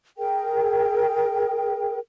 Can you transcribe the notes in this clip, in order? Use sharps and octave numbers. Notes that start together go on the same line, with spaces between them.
G#4 A#4 G5